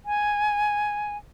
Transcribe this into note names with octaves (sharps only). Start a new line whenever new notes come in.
G#5